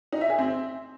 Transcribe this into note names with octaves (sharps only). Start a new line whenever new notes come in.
D#4
E5
G#4
C4